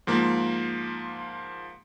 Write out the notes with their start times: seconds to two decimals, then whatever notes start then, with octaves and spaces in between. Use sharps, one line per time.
0.07 G#2 F3 A#3